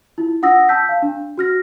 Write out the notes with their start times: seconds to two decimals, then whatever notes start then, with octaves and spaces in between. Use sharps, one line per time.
0.18 E4 F4
0.42 D4 F4 F#5 D#6 E6 A#6
0.69 A5 E6 G6 B6
0.89 F5
1.03 D4
1.38 F#4 F6 A#6